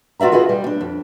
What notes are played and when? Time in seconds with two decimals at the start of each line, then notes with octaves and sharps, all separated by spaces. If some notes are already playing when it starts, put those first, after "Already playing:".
0.20 F4 F#4 D5 E5 A#5
0.32 F4 F#4 G#4 B4 C#5 D#5
0.49 G3
0.67 D4
0.81 F2